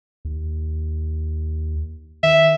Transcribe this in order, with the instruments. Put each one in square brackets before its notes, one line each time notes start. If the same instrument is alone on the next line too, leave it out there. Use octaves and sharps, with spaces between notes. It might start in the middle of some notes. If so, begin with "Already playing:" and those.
[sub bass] D#2
[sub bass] D#3 [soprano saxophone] E5